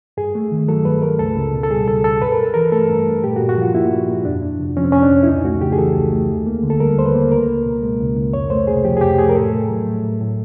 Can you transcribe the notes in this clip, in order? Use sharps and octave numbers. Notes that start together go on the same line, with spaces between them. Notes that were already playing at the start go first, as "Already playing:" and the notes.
G2 G#4
A3
D#3
F#3 A4
G2 B4
A3 A#4
C#2 A4
C#2
B2
A4
G3 G#4
C#2 A4
C#2 A4
G2 B4
A#4
G2 A4
E3 A#4
A3 A4
G2
G2
A#2 G4
F#4
A#2
F#4
F3 F4
A#3 E4
A#2
A#2
F2 D4
F2
C3
F3 C#4
C4
F2 C#4
D4
F2
E4
C#2 D#4
A3 F#4
C#3 G4
G#4
E3 A4
C#2
A3
D#2
A#3
D3
A4
G3 A#4
D#2 C5
B4
A#3
C#2 A#4
C#2
B2
G#3
C#2
C#2
F2 C#5
A3 C5
C3 G#4
F3 G4
G#4
F2 G4
A3 G#4
A#4
A2 A4
A2
F#3
A3
A2
A2